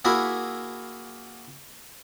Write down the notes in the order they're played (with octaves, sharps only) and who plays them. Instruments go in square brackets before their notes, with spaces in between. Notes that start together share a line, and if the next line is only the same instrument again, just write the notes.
[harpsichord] A#3 E4 F#4 G#4 E5